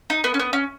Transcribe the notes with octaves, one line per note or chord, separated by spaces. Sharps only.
D#4
B3
C#4
B3
C#4